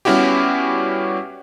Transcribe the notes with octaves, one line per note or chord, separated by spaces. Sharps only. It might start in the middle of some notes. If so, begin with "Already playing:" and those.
G3 B3 C#4 E4 F#4 G4